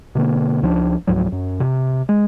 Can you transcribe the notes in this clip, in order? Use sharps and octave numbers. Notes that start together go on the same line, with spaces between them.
B2 D3 A#3
C#2 F3 C4 D4
C#2 G#2 F3 F#3
F#2
C3
G#3